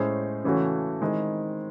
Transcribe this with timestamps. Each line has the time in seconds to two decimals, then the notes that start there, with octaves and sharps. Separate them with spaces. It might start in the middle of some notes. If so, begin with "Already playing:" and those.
Already playing: A2 G#3 C#4 G#4 C5
0.44 C#3 E3 A3 C#4 F#4
1.01 D#3 G#3 C4 E4